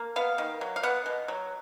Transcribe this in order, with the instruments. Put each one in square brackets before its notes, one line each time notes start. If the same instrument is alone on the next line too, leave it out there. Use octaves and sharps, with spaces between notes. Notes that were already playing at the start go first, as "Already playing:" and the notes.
Already playing: [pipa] A#3
B3 F5
D#3
F#3
F5
B3 F#5
B2
F#3